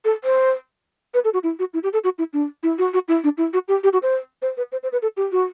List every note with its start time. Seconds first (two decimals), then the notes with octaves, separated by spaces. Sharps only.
0.05 A4
0.24 C5
1.14 B4
1.24 A4
1.33 F#4
1.43 E4
1.59 F#4
1.74 E4
1.83 G4
1.93 A4
2.04 F#4
2.18 E4
2.33 D4
2.63 E4
2.78 F#4
2.94 F#4
3.08 E4
3.24 D4
3.38 E4
3.53 F#4
3.68 G4
3.84 G4
3.93 F#4
4.03 C5
4.42 C5
4.57 B4
4.72 C5
4.83 C5
4.92 B4
5.02 A4
5.17 G4
5.32 F#4